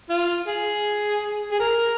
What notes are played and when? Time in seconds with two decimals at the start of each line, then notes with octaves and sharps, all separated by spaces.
0.10 F4
0.47 G#4
1.51 G#4
1.60 A#4